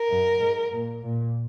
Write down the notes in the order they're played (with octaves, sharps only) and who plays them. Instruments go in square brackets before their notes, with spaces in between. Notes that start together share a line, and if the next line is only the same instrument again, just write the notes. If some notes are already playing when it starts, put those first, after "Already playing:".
Already playing: [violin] A#4
[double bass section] F#2
G#2
A#2
A#2